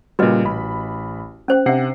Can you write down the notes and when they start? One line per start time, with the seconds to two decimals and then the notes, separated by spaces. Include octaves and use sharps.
0.19 A#2 C#3 G3 F#4 B4 D#5
0.45 A1 B5
1.48 C#4 C5 G5
1.66 C3 D4 E5 F#5 C7